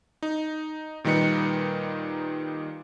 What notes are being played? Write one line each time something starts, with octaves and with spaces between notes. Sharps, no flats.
D#4
A#2 D#3 G3 D#4 B4 C#7